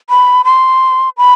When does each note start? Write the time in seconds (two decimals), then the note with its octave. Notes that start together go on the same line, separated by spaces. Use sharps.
0.10 B5
0.45 C6
1.17 B5